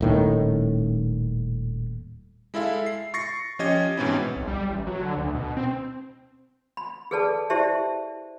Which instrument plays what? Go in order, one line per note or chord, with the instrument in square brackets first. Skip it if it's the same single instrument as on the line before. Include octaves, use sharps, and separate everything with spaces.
[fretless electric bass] D#1 A2 D#3
[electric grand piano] G#3 E4 A4 E5 F5
C7
C#6 A6 A#6 C7 C#7
F3 C#4 G4 D#5 G#6 A6
G#2 B2 E3 C4 C#4 E4
[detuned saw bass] B1
G3
A1
F#3
D3
D2
B2
C4
[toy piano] B5
G#4 A4 B4 D5 A5
E4 G4 C5 D5 E5 A5